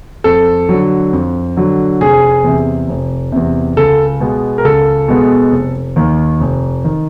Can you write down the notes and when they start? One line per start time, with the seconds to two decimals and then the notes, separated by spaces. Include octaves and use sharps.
0.24 F2 A4
0.69 D3 F#3
1.13 F2
1.57 D3 F#3
2.01 F1 G#4
2.44 E2 C3
2.89 F1
3.32 E2 C3
3.77 C#2 A4
4.20 B2 G#3 B3
4.58 A#4
4.65 C#2 A4
5.08 B2 G#3 B3
5.52 F1
5.96 D#2 D#3
6.41 F1
6.85 D#3